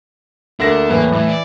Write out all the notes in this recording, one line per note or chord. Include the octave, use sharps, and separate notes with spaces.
D2 A#3 D4 A#6
E2 A2 A#3 B4
A2 E3
D5